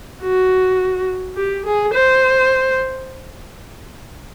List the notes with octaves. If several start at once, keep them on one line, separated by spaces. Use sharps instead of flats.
F#4
G4
G#4
C5